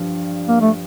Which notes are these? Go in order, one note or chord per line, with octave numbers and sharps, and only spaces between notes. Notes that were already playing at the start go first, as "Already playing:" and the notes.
Already playing: G2 F3
A#3
A3